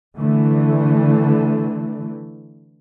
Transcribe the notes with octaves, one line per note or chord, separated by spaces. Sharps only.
D3 E3 A3